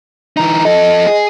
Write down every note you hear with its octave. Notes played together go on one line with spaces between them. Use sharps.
E3 D#4 A#5
F3 A4 D#5
G#4